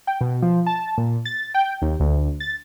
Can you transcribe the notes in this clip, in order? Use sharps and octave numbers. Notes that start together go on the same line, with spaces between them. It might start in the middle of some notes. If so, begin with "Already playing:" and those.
G5
B2
F3
A5
A#2
A6
G5
D#2
D2
A6